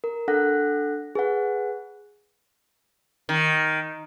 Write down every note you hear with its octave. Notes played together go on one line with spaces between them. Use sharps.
A#4
D4 A4 F#5 F#6 A#6
G#4 B4 F#5
D#3